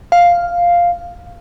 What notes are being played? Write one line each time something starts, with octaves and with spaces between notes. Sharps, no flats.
F5